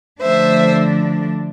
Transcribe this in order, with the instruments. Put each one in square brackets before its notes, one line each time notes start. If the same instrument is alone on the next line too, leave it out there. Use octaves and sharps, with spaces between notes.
[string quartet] D3 F3 A3 D4 C5 E5